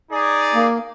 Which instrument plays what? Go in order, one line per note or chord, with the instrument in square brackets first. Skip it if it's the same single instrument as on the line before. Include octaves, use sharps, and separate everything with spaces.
[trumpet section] D#4 G#4 D5
[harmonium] A#3